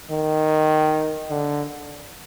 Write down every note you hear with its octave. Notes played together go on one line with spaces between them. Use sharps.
D#3
D3